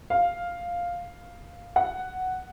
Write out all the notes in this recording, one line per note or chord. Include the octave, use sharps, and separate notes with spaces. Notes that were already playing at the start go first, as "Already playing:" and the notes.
F5
F#5